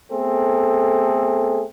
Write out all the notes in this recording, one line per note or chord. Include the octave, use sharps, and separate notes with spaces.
A3 B3 C4 G#4 A4